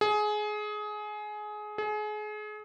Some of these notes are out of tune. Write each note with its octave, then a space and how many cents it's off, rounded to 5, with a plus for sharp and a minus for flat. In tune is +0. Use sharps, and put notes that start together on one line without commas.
G#4 +20
G#4 +30